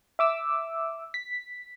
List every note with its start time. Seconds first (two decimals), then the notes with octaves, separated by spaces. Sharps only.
0.19 E5 D6 E6
1.14 B6